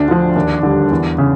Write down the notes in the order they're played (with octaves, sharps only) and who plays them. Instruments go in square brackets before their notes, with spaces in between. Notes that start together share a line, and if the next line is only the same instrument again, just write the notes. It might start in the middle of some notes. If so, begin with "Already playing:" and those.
Already playing: [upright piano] D2 D4
D3 F3
D#2
D3 G3
E2
C#3